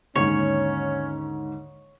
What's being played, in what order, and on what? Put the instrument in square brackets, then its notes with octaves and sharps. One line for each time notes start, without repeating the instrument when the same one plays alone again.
[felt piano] D#2 G#2 D3 [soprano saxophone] C#4 [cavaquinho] C#5